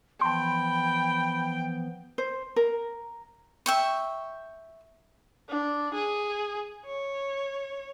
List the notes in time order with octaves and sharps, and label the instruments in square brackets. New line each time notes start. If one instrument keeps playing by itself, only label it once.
[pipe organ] E3 F3 B3 [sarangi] G5 [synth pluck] A5 C6 [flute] B5
[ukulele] C5
A#4
[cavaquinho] E5 G5 C#6
[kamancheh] D4
G#4
C#5